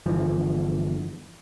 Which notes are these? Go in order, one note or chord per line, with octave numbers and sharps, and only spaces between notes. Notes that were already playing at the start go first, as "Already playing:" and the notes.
G1 E3 F3